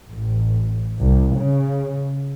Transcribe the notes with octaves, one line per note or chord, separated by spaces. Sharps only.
A1
C2
C#3